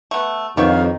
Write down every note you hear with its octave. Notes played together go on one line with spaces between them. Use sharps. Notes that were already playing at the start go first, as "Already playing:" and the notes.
A3 B3
F2 C3 D#3 B3 C#5 F5